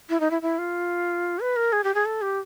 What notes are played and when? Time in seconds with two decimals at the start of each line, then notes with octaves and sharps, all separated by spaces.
0.10 E4
0.20 D#4
0.31 E4
0.42 E4
0.58 F4
1.40 B4
1.56 A#4
1.73 G#4
1.84 G4
1.95 G#4
2.05 A4
2.22 G4